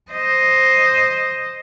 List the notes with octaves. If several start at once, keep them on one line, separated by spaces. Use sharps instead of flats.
C5 D#5